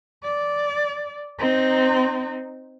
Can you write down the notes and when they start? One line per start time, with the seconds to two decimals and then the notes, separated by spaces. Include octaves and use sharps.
0.24 D5
1.39 C4 D#4